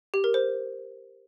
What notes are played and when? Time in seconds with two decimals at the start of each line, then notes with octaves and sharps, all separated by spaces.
0.14 G4
0.24 A#4
0.34 C5